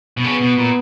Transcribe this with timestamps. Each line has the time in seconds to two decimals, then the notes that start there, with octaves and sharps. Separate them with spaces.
0.17 B2
0.24 C#3 B3
0.41 B2
0.58 A#2